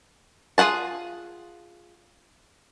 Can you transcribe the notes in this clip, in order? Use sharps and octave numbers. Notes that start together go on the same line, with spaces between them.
F4 G#4 A#4 F#5 A5